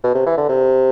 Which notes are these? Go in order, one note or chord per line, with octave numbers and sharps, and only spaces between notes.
B2
C3
E3
D3
C3